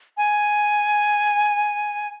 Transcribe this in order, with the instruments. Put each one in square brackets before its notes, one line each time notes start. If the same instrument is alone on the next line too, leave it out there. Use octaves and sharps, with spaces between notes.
[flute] G#5